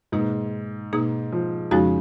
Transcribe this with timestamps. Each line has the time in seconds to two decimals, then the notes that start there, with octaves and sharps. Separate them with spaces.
0.12 G#2 B2 A#3 D#4 G#4
0.93 B2 A#3 D#4 G#4
1.32 F3
1.71 F2 C#3 F3 G#3 D#4 F#4